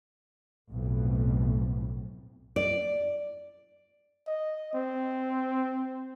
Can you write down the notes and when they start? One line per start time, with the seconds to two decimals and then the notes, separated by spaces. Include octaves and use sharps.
0.69 B1 F2 A2
2.56 D5
4.27 D#5
4.73 C4